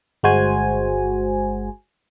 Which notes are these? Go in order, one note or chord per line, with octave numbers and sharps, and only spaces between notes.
G1 G#3 F#4 C5 G#5